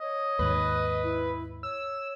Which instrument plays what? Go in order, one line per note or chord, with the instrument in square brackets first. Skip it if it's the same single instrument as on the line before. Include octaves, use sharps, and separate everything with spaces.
[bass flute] C#5 [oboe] D#5
[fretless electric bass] D#2 G#2 D#3 [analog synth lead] B4
[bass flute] E4
[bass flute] C#5 [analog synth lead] E6